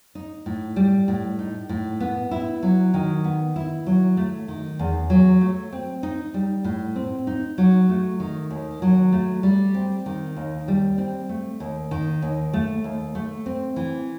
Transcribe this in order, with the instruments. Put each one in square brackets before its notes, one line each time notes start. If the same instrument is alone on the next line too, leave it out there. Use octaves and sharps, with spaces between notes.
[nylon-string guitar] D#4
A2
G3
A2
D#4
A2
B3
E4
F#3
D#3
B3
E4
F#3
A3
D#3
E2
F#3
A3
C4
D#4
G3
A2
C4
D#4
F#3
A3
D#3
D#2
F#3
A3
G3
C4
D#3
D#2
G3
C4
A3
D#2
D#3
D#2
A3
D#2
A3
C4
E3